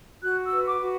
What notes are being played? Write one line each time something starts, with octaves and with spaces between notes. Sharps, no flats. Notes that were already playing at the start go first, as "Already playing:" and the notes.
F#4 F#6
E6
B4
D6
F#4